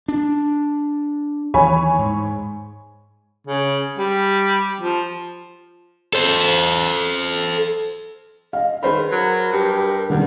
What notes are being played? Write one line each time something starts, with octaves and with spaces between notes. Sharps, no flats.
D4
D#2 E3 C#5 G#5 B5
G#2
C#3
G3
F3
A4 C5
D#5 F5
D#3 G#4 B4 C5 B5
F#3 A#4
G2 G4
D#1 E2 D3 G3